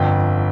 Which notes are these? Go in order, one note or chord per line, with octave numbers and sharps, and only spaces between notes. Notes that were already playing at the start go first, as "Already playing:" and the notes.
Already playing: G1 F2 D3 G5